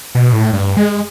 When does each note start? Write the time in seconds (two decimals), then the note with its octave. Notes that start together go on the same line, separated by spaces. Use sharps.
0.15 B2
0.32 A2
0.53 G2
0.77 G#3